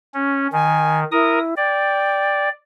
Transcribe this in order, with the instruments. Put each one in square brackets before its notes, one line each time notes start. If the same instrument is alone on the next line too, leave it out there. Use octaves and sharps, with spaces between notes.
[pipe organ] C#4
[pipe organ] D#3 [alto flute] G#5
[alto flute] E4 [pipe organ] A#4 D#6
[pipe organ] D5 [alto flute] G5